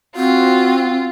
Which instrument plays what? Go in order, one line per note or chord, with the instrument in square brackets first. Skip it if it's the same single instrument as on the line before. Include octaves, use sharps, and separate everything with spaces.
[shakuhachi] C4 [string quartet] F4 [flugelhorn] F#4